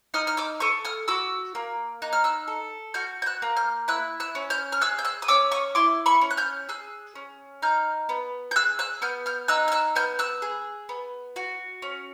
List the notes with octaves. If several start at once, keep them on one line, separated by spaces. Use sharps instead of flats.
D#4 D#6 F6
F6
D6 E6
A4 C#6 D#6
D#6 F6
F#4 D6 E6
A#3
D#4 F#6
F6
E6 F#6
A4
F#4 F6 G6
G6
E6 F#6
A#3
F6 G6
E4 E6 F#6
E6 F#6
C#4
F6 G6
F6
G#4 E6 F#6
G6
E6 F#6
D#6
C#4 D6 E6
C#6 D#6
E4 C6 D6
B5 C#6
C#4
F#6
F6 G6
G#4 E6 F#6
C#4
D#4 F6 G6
B3
G6
G#4 E6 F#6
E6 F#6
B3 F6 G6
F6 G6
D#4 E6 F#6
F6
E6 F#6
B3 F6 G6
E6 F#6
G#4
B3
F#4
C#4